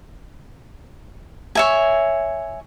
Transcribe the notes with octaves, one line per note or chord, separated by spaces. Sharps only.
C#5 E5 G#5